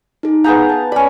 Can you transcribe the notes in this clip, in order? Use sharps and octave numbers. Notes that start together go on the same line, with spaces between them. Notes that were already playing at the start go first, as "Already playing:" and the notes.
D#4 G#4
B3 G#4 F5 A#5 G6
A5
C#4 G#4 D5 B5